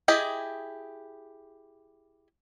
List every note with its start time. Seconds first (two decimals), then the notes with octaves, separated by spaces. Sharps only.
0.08 E4 G4 G#4 D#5